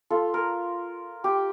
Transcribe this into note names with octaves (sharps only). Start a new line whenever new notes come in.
F4 A4
A#4
G4